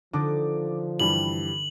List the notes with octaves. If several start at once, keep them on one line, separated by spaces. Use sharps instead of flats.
D3 F3 D4 D#4 D6
G2 E3 G3 F#7